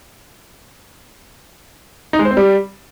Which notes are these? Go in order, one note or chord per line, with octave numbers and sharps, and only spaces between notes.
D#4
G#3
C5
C4
G3